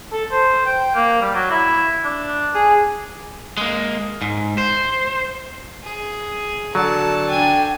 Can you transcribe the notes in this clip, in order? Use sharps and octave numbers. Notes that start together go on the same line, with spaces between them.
A4
C5
G5
A#3
G3
F#3
E4
D4
G#4
G#3 A#3
G#2
C5
G#4
D3 F#3 A5
D4 G5 G#5